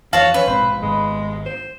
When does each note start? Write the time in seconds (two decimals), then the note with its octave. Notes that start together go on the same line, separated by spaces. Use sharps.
0.13 F2 E3 F#4 C#5 F5 A5
0.34 C#4 B4
0.47 A#1 G#2 B2 C4
0.82 G#1 G#2 G#3 B3
1.46 C5